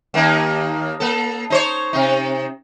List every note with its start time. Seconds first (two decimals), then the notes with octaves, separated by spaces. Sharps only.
0.14 D#2 A#3 D#4
1.00 A#3 A4
1.50 D#4 C5 C#5
1.93 C3 D#4